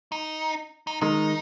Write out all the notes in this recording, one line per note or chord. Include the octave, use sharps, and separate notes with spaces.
D#4
D#4
D#3 G#3 D#4